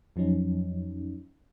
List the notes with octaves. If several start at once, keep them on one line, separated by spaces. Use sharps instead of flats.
F2 F3 F#3 C#4 D#4